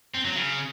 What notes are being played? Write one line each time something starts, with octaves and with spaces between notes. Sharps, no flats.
C4
F#3
C#3